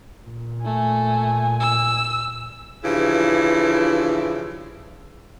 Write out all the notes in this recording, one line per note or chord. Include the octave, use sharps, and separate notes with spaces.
A#2
A3 G#5
E6
G2 C#3 E3 F3 E4